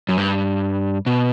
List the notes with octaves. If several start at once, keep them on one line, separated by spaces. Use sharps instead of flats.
F#2
G2
B2